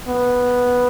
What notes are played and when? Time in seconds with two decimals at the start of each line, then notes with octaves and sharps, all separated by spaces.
0.08 B3